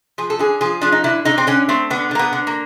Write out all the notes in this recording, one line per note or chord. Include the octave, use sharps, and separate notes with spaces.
F3 G#4
A4
D3 G#4
F3 G#4
F3 D4
D#4
D3 E4
D3 D#4
C4
D3 C#4
A3 C4
D3 B3
D3 A#3
B3
D3
A#3